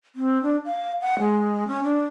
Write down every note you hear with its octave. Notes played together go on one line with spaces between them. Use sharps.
C4
D4
F5
F#5
G#3
C#4
D4